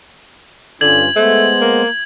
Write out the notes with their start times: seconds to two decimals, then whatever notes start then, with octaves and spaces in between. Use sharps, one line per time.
0.81 G2 D3 C#4 F4 G#6 F#7
1.16 G#3 A3 B3 C5
1.61 A#3